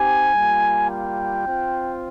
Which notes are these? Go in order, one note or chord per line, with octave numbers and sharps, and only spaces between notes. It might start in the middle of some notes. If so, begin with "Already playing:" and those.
Already playing: C4 D#4 G4 G#5
G3 A#3 F4
G5
C4 F4